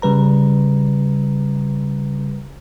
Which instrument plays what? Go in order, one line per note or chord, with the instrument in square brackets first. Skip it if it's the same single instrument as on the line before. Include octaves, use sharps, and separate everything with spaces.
[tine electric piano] C#3 G3 B4 A#5